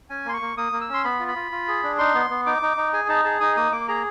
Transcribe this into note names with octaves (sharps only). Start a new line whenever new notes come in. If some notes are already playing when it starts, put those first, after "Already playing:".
C#4 G#5
A#3 C6
C#6
A#3
A#3 D#6
A#3
E6
C#4 C6
B3 B5
F4
B5
F4
F4
G#4
D4
D#4 C6
B3
B3
D#4 D6
D#4
D#4
G#4 G#5
D#4 A5
G#4 A5
D#4 D#6
A#3 D#6
A#3 D6
G#4 A#5